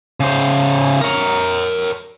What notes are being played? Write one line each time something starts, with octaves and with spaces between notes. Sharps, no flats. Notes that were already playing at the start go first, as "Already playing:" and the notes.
C#3 C5
A#4 C#5